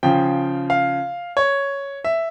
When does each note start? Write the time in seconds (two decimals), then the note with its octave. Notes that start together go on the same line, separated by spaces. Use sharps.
0.03 C#3 F3 G5
0.70 F5
1.37 C#5
2.04 E5